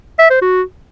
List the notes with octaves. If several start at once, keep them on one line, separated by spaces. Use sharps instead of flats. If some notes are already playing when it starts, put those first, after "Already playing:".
E5
C5
F#4